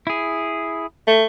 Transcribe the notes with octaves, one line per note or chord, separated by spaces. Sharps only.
E4 G#4
A3